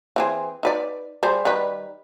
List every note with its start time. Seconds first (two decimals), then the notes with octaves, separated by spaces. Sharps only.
0.16 E3 C4 G#4
0.63 D#4 B4 D5
1.23 G3 G#4 C5
1.45 D#3 G3 B4